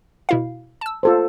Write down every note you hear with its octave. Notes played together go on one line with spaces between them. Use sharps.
B2 E4 F5
A5 E6
F4 A4 C5